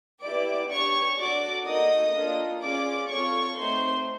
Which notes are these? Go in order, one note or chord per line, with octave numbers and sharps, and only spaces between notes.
B3 E4 G4 D5 D6
D4 G4 C#5 C#6
D4 F#4 A4 D5 D6
A#3 D#4 F#4 A4 D#5 D#6
A#3 D4 F4 A4
C#4 F4 G#4 D5 D6
C4 F4 A4 C#5 C#6
A3 C4 D#4 C5 C6